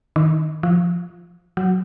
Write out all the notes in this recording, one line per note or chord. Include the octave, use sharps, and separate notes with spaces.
D#3
F3
F#3